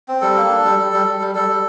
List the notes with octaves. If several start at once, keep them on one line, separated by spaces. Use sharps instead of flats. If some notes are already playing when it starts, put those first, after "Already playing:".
C4
G3 A4
A#3
D4
G3
G3
G3
G3
G3
G3 A4
G3